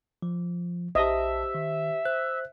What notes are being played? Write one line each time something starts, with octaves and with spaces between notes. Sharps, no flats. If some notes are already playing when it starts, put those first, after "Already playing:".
F3
A#1 G4 C5 D#5 E5 A5
D#3
C5 F#6